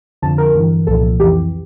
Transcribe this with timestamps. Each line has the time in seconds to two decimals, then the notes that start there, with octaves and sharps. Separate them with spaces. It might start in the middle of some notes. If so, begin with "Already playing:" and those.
0.22 F2 D3 F3 A5
0.38 A#4
0.55 G2 E3
0.87 C2 A#2 F3 A4
1.19 F2 E3 G4